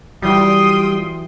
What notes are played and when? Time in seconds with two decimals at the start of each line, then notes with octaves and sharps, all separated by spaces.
0.22 E3 F#3 G3 F4 G5 C6 D#6